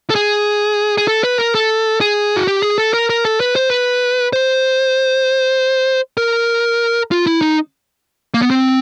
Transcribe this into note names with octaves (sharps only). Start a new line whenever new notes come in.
A4
G#4
G#4
A4
B4
A#4
A4
G#4
F#4
G4
G#4
A4
A#4
A#4
A4
B4
C5
B4
C5
A#4
F4
E4
D#4
A#3
B3
C4